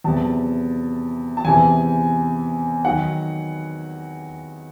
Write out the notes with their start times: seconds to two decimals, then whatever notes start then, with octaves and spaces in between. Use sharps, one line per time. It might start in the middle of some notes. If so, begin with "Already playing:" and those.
0.04 E2 C3 F#3 A5
1.37 A5
1.45 E2 C3 E3 G#5
2.85 D#3 F#3 F#5